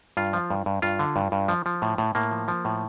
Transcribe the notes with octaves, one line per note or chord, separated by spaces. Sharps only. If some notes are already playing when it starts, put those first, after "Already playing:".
G2 F4
F3
G2
G2
G2 F4
D3
G2
G2
F3
F3
A2
A2
A2 A#3
F3
F3
A2